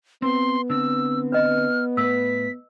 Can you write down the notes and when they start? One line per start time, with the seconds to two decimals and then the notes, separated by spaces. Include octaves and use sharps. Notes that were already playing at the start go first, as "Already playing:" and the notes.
0.22 B3 C4 C6
0.70 D3 C4 E6
1.32 B4 D#5 F6
1.97 A2 B4 E6 B6